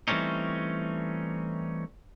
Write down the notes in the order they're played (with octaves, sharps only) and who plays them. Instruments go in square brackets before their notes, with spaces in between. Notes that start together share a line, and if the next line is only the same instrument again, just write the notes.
[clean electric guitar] E3 G3 A3 C4 C#4 D#4